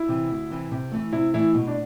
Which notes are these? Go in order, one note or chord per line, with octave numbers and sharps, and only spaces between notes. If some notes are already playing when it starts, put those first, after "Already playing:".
Already playing: E4
C3 E3
D2
C3 E3
C3
E3 A3
C3 E4
E3 A3 E4
B2
D4